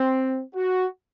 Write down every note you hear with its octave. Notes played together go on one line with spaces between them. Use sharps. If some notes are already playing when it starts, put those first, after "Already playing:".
Already playing: C4
F#4